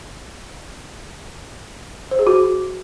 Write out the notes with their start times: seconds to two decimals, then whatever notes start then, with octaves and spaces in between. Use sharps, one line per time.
2.11 C5
2.19 G#4
2.27 F#4